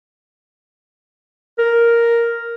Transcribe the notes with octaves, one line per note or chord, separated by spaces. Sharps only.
A#4